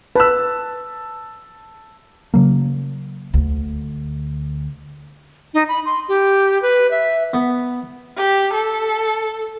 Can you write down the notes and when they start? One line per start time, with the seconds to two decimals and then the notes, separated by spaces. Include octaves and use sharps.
0.16 B4 A5 E6
2.34 C#3 F#3 A#3
3.34 D2
5.54 D#4
5.69 B5
5.85 C6
6.09 G4
6.62 B4
6.91 E5
7.34 B3
8.17 G4
8.53 A4